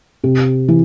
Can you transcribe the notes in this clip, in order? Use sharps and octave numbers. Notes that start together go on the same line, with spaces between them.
C3
E3